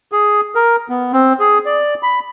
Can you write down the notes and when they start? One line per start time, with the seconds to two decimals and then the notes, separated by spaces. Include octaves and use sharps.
0.12 G#4
0.55 A#4
0.89 B3
1.13 C4
1.40 G#4
1.66 D5
2.03 B5